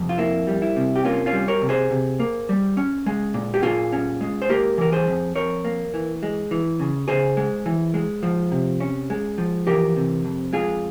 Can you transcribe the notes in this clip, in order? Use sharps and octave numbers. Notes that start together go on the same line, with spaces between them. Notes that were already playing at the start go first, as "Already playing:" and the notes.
Already playing: F2 C3
F4
A#3 E4
G3
E4
C3
G4
A#3 C#4 F4
C#4 F4
G3
A#4 C#5
C3
G#4 C5
C3
A#3
G3
C#4
G#3
A#2
G4
A#2 F4 G#4
C#4
G#3
C5
A#3 G4 A#4
E3 A#4
G#4 C5
F2
F2 A#4 C#5
A#3
E3
G#3
E3
C#3
C#3 G#4 C5
G#3
E3
G#3
F3
C3
C#4
G#3
F3
E3 G4 A#4
C3
F2
G#3 F4 G#4